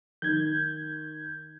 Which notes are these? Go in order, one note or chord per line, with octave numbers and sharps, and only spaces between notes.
D#3 G6 G#6